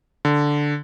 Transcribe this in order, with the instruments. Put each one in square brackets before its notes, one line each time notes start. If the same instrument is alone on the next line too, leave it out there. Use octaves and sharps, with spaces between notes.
[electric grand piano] D3